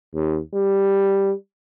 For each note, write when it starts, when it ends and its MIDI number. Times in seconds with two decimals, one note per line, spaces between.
0.14 0.38 39
0.54 1.32 55